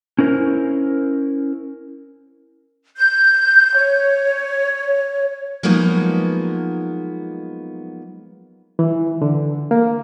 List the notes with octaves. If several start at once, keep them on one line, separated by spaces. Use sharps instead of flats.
C#4 E4 A#4 C5
G6
C#5
F3 F#3 G#3 A#3 B3 D#4
E3
D3
A#3